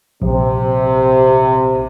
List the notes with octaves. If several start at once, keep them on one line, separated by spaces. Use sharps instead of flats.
A#1 C3